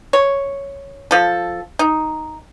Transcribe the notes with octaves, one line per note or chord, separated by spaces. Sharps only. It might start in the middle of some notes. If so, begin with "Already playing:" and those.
C#5
F3 A4
D#4